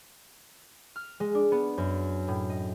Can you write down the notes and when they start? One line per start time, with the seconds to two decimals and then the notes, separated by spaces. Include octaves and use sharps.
0.96 F6
1.20 G#3
1.35 D4
1.52 B3
1.78 F#2
2.28 A2
2.49 D#5